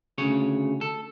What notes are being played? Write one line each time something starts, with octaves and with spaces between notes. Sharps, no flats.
D2 C#3 C#5
A4